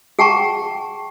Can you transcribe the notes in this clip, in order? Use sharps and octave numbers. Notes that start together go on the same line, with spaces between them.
G#4 F#5 G5 A5 A#5 C#6